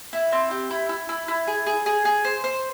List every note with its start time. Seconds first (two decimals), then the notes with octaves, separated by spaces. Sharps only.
0.13 E4
0.32 C4
0.51 G4
0.71 E4
0.89 E4
1.09 E4
1.28 E4
1.47 G#4
1.66 G#4
1.86 G#4
2.05 G#4
2.24 C5
2.44 C5